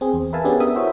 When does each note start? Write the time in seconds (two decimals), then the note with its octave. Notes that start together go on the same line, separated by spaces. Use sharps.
0.01 C4 G#4
0.14 E2
0.33 A#4 B4 E5 F5 G#5 A5
0.44 B3 C#4 D4 G4 G#4
0.60 B3 A#4 E5 D#6
0.75 E4 F#4 C5 C#5 E5